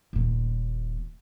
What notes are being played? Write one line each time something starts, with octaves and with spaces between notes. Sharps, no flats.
D#1 A#2